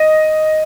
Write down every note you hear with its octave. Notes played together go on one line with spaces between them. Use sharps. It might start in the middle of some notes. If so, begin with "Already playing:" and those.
Already playing: D#5